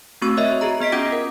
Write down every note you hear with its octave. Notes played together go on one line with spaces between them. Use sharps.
A3 C4 F#4 C#6 E6
A#4 C#5 D#5 E5
F#4 G#4 A#5
B3 D#5 B6 D7
C#4 F4 G5 D6 G#6 A#6
A#4